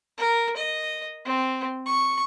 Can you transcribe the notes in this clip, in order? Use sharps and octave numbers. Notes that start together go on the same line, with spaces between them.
A#4
D#5
C4
C#6